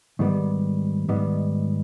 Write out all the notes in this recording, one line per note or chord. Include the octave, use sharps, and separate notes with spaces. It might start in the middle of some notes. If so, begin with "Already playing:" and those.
G#2 D#3 G3 B3
G#2 D#3 G3 B3